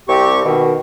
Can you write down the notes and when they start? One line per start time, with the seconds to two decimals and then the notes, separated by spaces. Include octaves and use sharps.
0.09 C2 C4 G4 C#6
0.45 B2 D#3